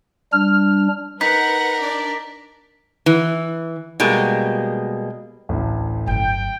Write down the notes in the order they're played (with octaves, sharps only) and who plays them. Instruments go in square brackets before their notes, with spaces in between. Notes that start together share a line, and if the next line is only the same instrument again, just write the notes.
[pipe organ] G3 D4 [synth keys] F6
[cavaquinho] D#4 [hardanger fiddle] A#4 [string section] B4 F#5 [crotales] B6
[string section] D4 D5
[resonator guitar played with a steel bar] E3
B2 G3 G#3 A#3
[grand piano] A1 D2
[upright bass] G1 F#3 [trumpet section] G5